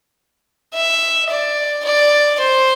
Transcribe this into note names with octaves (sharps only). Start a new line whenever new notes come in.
E5
D5
D5
C5